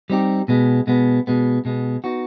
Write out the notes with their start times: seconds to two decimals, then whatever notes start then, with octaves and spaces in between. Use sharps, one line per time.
0.10 G3 C4 D#4 G4
0.48 B2 G#3 B3
0.87 B2 G#3 B3
1.27 B2 G#3 B3
1.65 B2 G#3 B3
2.04 B3 D#4 F#4